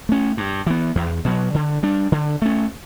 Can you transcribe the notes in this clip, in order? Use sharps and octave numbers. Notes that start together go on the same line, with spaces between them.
A3 C#4
G2
E3 B3
E2
B2 F#3
D3
G3 D4
D3
A3 C#4